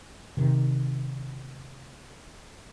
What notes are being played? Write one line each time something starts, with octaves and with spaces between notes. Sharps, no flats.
C3 D#3